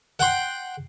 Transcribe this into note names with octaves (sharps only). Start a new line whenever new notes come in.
F#5 G5 C6